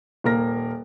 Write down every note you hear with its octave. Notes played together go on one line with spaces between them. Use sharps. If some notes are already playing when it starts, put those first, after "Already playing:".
D#1 A#3 A#4 A#6